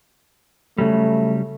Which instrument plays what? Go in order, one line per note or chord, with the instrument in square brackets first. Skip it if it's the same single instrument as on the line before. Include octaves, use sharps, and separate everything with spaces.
[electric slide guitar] C#3 F#3 G3 [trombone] A3